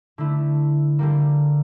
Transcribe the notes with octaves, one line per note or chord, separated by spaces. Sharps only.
D3 A3 E4
D3 G3 A#3